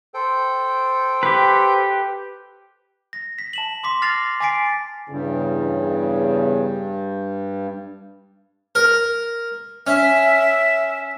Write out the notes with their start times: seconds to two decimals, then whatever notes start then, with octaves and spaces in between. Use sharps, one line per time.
0.14 A4 C5 G5
1.23 G4 B4
3.13 A#6
3.38 B6
3.53 A5 E7 F#7
3.83 C6 D6 B6
4.02 D6 F6 A6 A#6 C7 F7
4.40 G#5 D6 A6 B6 C7 D7
5.09 E2 G2 C#3
8.75 A#4
9.87 C#4 E5